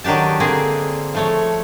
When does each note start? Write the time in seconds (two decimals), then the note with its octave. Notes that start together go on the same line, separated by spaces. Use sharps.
0.04 D#3 F#3 D4 G4 A5
0.40 D3 A#3 C4 G#4
1.15 F3 A3 C#5